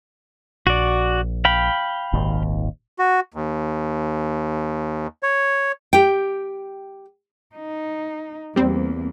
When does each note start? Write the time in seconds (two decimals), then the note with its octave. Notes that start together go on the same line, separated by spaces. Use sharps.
0.67 A#1 F#4 D5
1.45 F5 G5 B5
2.13 D#1 G#1 D#2
2.99 F#4
3.34 D#2
5.23 C#5
5.93 G4 G5
7.55 D#4
8.56 E2 G3 A#3 C4